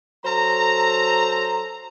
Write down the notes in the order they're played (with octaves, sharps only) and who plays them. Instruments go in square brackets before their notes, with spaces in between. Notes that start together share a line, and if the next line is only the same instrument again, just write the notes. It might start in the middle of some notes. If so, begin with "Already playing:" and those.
[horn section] F#3 A4 C5 A#5